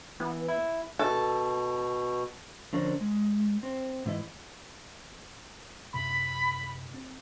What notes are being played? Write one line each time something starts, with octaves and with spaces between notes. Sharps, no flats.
E3 B3
E4
B2 A4
D3 F3 C#4 D4 A#4 C5
G#3
C4
G#2 E3 E4 D#5
F#2 C3 B5 C6
C4